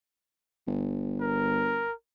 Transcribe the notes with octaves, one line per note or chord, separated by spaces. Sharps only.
G1
A#4